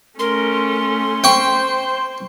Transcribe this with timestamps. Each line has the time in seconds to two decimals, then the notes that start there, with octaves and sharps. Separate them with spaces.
0.19 A3 C#4 A#4 C6
1.24 C5 G5 C#6